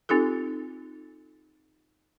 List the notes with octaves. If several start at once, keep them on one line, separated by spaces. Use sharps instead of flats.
C4 D#4 F4 G4 A4